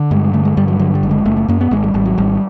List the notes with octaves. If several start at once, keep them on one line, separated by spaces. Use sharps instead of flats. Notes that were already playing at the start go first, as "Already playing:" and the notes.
Already playing: D3
G2 G#3
D3 A3
G#3
G2 G3
F#3
D3 F#3
G3
F#1
G#3
F#1 A3
A3
F#2 A#3
B3
G#1 G#3
G3
G#1 G3
F#3
G#1 G3